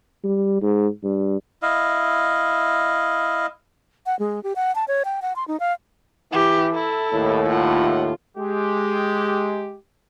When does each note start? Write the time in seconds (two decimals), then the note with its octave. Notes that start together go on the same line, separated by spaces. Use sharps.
0.24 G3
0.62 G#2
1.04 G2
1.62 E4 D#5 F5
4.06 F#5
4.19 G#3
4.43 G4
4.56 F#5
4.75 A5
4.88 C#5
5.05 G5
5.22 F#5
5.36 C6
5.48 D#4
5.60 F5
6.32 E3 G4
6.74 E4 A4
7.14 D#2 A2
7.50 F4 F#5
8.37 G#3 G4